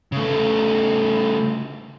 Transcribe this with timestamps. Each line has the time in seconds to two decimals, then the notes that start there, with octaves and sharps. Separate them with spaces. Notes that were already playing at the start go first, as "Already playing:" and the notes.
0.12 C#3 A3